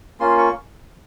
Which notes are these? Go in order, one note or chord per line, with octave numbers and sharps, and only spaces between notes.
A#3 C#4 F4 C6
C#6